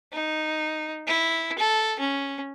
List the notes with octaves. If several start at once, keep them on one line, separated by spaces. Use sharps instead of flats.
D#4
E4
A4
C#4